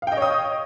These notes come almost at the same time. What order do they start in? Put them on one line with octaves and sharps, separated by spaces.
F5 G5 D#5 C#5 D#6